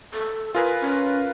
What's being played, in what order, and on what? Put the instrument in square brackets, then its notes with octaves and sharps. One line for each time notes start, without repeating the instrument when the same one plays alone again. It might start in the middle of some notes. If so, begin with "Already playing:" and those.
[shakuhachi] A4
[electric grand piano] F4 A#4 B4 [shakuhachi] G#5
[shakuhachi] C#4